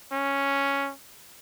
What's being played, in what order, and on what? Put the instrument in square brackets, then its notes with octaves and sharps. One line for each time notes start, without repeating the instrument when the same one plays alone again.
[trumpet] C#4